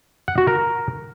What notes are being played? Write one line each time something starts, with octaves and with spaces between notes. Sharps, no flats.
F#5
F#4
A#4